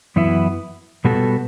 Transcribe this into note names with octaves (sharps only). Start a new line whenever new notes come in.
F#2 E3 B3 E4
B2 G3 B3 F#4 A4